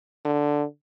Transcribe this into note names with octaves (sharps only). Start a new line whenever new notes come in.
D3